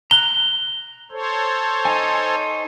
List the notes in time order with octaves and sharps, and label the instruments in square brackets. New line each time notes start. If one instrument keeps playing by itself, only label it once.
[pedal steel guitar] A#5 F#6 [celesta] G7
[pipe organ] A4 C5 C#5
[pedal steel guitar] D#4 G#5